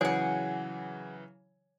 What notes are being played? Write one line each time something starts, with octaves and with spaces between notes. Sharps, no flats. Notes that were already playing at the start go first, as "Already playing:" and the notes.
C#3 E3 F#3 G#4 C#5 F#5 G#5